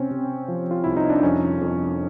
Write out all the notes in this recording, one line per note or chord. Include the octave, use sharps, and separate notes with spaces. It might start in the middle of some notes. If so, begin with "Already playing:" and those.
Already playing: C3 C4 C#4
C3
F3
F4
C2 E4
D#4
D4
F2 C#4
F2